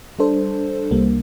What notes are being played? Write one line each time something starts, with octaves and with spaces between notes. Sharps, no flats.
G3 D4 A4 C5
C2 C3 G3 A#3